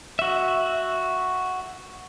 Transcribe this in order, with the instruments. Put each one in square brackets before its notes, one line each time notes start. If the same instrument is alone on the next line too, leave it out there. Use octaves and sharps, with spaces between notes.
[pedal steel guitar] F#4 E5